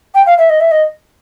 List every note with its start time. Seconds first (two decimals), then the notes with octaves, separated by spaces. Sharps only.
0.15 G5
0.26 F5
0.38 E5
0.50 D#5
0.60 E5
0.71 D#5